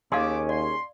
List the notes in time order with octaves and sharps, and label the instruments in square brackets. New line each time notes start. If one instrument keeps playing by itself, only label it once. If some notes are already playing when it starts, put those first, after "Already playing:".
[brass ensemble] D#2 [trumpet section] A3 D6 [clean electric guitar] C#4 G#4 [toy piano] D#5 F5 C6
[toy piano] D5 [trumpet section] C6